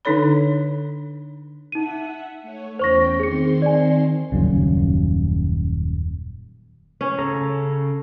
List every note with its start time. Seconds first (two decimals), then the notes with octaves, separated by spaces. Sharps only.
0.05 D3 D4 D#4 A4 C#5 B5
1.72 D#4 E5 F#5 D#7
2.42 A3 C#5
2.79 E2 C#4 C5 G5 C#6 A#6
3.20 D#3 C4 G#4 C6 C#7
3.62 D5 G#5
4.32 D#1 F#2 C#3
7.01 C#4
7.19 C#3 A4 A#5